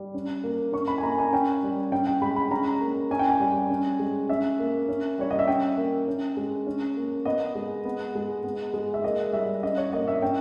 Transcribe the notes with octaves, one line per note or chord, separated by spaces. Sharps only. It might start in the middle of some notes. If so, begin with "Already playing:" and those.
Already playing: G3
C#4
A#3
C#4 C#6
B5
G#5
A#3 A#5
G#5
C#4 G5
G3
C#4 G5
G5
G#3 B5
B5
C#4 A#5
A#3
C#4 G#5
G5
G#5
G3
C#4
G#3
C#4 E5
A#3
C#4
G3 C#5
D#5
E5
C#4 G5
A#3
C#4
G#3
C#4
A#3
B3 D#5
G#3
B3
G#3
B3
G#3
E5
A#3 D#5
G3 E5
C#4 D#5
C#5
A#3 D#5
E5
C#4 G5